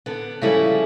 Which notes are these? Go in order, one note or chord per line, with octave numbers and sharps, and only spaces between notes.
D3 B3
C#3 F3 G3 E4 G#4 A4